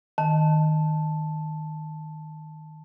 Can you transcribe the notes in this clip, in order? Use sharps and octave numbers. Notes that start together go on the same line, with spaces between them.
D#3 A5